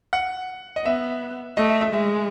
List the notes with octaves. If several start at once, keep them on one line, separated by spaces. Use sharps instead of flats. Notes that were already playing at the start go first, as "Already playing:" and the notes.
F#5
D#5
B3 E5
A3 D#5
E5
E5
G#3 E5